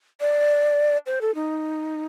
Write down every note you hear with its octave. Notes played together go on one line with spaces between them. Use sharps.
D5
C5
A4
D#4